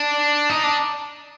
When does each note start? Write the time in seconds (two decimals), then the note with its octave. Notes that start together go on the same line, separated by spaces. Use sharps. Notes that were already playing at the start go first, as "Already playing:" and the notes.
Already playing: D4
0.50 D#4
0.64 D4